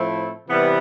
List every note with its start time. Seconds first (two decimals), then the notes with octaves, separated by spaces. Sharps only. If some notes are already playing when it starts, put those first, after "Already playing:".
Already playing: A2 F3 A3 C4 E4
0.47 C3 E3 G3 B3